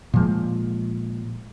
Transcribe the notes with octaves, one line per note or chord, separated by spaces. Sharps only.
A#2 F3 G#3